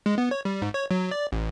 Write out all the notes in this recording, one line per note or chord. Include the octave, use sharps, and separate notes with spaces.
G#3
B3
C#5
G3
G#2
C#5
F#3
D5
A1